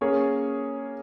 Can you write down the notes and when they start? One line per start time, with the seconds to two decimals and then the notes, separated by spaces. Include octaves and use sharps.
0.01 A#3 C#4 G#4 C#5